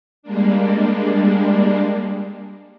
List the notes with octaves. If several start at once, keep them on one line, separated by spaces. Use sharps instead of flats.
G3 G#3 A#3 D4